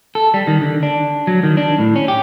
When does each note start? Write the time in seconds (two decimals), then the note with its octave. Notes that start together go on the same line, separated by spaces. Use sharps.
0.15 A4
0.34 G3
0.47 D#3
0.61 D3
0.83 D4
1.27 F#3
1.43 D#3
1.57 D4
1.78 A2
1.96 C#4
2.08 G4